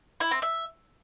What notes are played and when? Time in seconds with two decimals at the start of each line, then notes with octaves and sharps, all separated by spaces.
0.20 E4
0.31 C4
0.42 E5